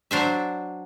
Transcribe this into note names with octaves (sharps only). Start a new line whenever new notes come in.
F#3 D4 C5 E5